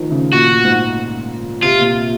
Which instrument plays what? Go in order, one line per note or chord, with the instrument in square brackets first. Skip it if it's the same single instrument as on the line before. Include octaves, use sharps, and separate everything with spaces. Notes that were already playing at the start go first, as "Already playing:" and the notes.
Already playing: [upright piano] D#3 F3
C#3
[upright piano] A#2 [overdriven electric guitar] F#4
[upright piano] G#2
[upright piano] C3 [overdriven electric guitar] F4
[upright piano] A#2